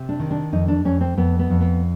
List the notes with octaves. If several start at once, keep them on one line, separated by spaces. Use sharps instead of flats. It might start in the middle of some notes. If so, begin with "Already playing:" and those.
Already playing: C3
D4
D#3
D4
F2 D#4
D4
F2 C#4
C4
F2 B3
B3
F2
B3